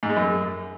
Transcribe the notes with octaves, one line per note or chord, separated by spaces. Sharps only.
G#2
G#3
F#2